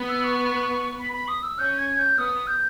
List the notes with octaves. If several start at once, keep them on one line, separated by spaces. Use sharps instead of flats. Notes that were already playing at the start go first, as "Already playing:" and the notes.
Already playing: B3
E6
C#6
B5
B5
D#6
E6
C#4 G6
G#6
G6
B3 D#6
G6